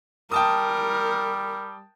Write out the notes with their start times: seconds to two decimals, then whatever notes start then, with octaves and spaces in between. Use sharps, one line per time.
0.31 G3 A#4 G5 A5 D#6